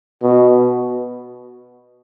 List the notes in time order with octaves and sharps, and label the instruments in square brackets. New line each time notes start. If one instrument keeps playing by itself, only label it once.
[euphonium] B2